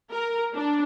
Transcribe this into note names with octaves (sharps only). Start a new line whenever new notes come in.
A#4
D4